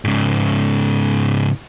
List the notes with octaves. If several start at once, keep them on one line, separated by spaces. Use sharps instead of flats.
G#2 C#3